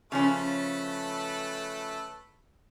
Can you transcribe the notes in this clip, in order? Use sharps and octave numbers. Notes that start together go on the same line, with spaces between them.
C#3 F3 A3 C#4 A4 B4